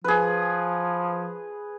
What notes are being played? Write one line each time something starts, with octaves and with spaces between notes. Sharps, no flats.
F3 G#4 B4